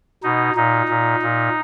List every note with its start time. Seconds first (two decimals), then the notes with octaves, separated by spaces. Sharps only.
0.23 B2 D#4
0.56 A#2 D#4
0.89 A#2
1.22 A#2